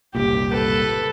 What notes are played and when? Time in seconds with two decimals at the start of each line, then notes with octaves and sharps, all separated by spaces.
0.15 F#1 C2 A#2 G4
0.51 A4 B4